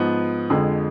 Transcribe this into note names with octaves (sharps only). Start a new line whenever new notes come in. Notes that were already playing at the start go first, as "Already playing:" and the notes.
Already playing: G#2 F3 B3
F2 D3 F3 G#3